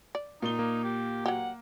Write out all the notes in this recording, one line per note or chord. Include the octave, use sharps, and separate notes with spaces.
D5
A#2 D#4 G7
A#3
G4
F#3 G4 F#5